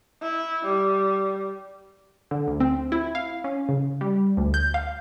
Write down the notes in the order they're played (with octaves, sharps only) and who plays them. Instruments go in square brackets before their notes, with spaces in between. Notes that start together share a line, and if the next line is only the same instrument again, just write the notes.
[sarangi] E4
G3
[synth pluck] D3
D2
C4
E4
F5
C#4
C#3
G3
D2
G6
F5